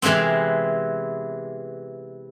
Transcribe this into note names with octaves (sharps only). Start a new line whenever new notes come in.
C3 E3 G#3 B3 C4